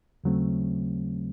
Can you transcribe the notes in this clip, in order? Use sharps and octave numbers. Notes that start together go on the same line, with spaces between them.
D#2 C#3 F#3 A3 C4